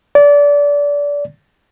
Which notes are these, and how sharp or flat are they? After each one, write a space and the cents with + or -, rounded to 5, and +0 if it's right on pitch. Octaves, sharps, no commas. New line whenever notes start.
D5 -25